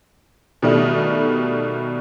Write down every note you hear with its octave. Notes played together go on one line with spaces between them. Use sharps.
B2 D#3 G3 A3